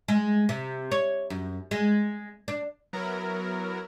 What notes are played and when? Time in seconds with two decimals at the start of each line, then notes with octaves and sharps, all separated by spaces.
0.08 G#3
0.49 C3
0.91 C#5
1.30 F#2
1.71 G#3
2.48 D4
2.93 F#3 B3 E4 A#4